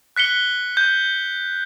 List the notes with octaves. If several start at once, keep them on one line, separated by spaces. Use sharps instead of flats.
F#6 B6 C#7 G7
G6